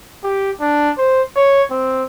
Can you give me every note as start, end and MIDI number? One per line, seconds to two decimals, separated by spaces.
0.24 0.51 67
0.61 0.91 62
0.98 1.22 72
1.36 1.62 73
1.71 2.04 60